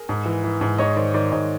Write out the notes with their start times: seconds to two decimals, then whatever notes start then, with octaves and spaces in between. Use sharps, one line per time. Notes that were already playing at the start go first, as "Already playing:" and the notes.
Already playing: G#4 A#4
0.09 G#2
0.26 E3
0.44 E3
0.61 G#2
0.78 G#2 C#5 D#5
0.96 D#3 C5 D5
1.14 D#3 C5 D5
1.32 G#2 C#5 D#5